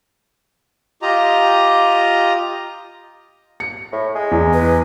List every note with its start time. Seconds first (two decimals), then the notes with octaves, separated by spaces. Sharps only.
1.02 F4 G4 D#5 A#5
3.60 C#7
3.92 A2
4.15 G#3
4.31 E2
4.53 B4